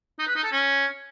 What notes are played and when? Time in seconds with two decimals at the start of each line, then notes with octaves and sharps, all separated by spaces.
0.19 D#4
0.27 B4
0.35 D#4
0.44 A4
0.52 C#4